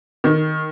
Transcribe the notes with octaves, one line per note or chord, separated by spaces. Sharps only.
D#3